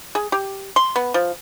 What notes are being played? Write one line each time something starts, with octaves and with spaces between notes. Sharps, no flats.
G#4
G4
C6
B3
F3